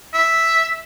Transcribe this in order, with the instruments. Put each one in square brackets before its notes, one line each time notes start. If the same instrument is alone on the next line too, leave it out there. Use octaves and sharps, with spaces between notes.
[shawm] E5